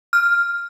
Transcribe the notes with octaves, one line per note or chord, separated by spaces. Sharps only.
F6